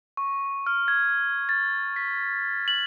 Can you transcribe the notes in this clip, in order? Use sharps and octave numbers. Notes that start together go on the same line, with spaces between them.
C#6
F6
G#6
A6
B6
F#7